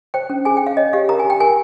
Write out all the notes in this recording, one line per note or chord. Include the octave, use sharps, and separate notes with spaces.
C5 G5
C#4
G#4 G#5
G5
C#4 F5
C#5 D#5
G4 F5
A#4 A#5
G#5
G4 G5
A#4 G#5